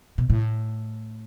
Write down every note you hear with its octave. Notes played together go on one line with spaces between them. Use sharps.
B2
A2